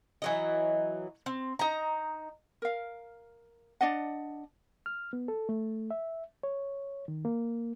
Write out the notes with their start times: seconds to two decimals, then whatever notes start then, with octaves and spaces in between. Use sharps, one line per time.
0.22 E3 F#3 D#5
1.26 C4
1.59 D#4 A#5
2.62 A#4 F5
3.81 D4 D5 D#5 F#5
4.86 F6
5.13 B3
5.28 A4
5.49 A3
5.91 E5
6.43 C#5
7.08 D#3
7.25 A#3